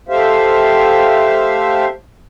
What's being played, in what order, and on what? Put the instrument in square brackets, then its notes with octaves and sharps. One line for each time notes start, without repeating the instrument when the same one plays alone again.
[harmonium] A3 G4 C5 E5 F5